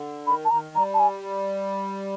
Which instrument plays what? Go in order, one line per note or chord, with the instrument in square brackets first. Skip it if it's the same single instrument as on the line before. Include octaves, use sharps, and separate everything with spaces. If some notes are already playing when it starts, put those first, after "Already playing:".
Already playing: [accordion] D3
[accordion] D#3 [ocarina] B5
[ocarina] A5
[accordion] D#3 [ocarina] A#5
[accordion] G3 [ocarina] A#5
[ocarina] A5
G#5